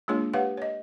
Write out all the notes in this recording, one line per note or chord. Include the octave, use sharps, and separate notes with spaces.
G#3 A#3 D4 F4 G#4 C#5
G4 B4 C#5 F5 F#5
C#5 D#5